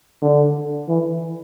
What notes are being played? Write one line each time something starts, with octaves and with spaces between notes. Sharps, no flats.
D3
E3